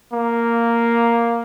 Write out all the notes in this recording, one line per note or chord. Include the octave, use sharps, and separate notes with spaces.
A#3